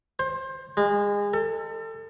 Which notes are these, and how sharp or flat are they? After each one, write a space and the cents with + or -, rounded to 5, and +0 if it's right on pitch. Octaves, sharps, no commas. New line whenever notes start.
C5 +20
G#3 -30
A4 +35